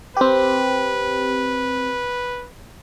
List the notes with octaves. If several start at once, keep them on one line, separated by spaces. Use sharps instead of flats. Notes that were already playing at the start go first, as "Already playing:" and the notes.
C4 G4 B4